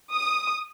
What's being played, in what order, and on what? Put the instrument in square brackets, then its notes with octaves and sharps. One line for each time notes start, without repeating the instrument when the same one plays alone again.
[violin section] D#6